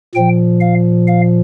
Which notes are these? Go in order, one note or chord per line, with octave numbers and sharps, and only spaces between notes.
A#2 F3 G5
F5
F5